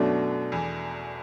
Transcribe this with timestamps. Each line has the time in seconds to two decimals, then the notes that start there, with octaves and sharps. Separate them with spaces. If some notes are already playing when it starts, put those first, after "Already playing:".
Already playing: F#2 B2 F#3 A3 D4
0.52 E2 E3